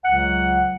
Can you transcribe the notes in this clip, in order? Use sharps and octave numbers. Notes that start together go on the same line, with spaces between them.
C#2 C#3 F#3 F#5